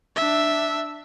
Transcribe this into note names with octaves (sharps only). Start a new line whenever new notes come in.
D4 E5